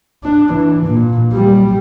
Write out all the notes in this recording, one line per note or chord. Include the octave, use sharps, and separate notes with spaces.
D4
E3
A#2
G3